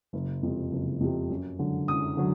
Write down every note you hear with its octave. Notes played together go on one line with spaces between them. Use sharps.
F#1
F2 C3
F#1
F2 C3
F#2
D3 F#3
F#2 D#6
D3 F#3